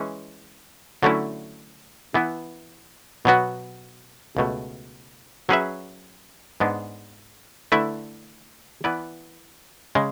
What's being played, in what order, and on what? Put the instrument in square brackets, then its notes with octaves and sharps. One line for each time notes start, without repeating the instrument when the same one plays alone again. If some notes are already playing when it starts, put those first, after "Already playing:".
Already playing: [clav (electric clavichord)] E3 G#3 C#4
D3 F#3 A3 C#4 E4
E3 B3 E4
B2 F#3 B3 F#4
C#2 B2 A3
F#3 C#4 G#4 B4 E5
G#2 G#3 B3 D4
D3 A3 E4 B4 E5
E3 B3 E4 B4 D5
C#3 G#3